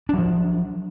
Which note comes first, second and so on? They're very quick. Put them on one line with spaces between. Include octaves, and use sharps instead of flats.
D4 F#3 F3